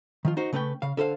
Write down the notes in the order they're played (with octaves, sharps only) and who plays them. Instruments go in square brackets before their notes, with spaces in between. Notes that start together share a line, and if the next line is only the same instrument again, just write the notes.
[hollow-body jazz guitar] D#3 F3 F4
D#4 F#4 C5
C#3 A3 C#4 B4 G5
C#3 F5
D3 A4 C5 F5